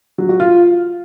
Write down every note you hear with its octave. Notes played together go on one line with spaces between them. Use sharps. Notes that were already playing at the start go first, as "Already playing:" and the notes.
F#3
F#4
F4